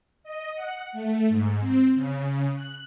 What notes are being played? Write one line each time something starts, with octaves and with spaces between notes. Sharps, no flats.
D#5
F#5
A3
G#2
C4
C#3
F#6